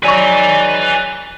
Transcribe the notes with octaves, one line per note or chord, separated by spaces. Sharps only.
F#3 G#3 D#4 B4 D5 G#5 C#6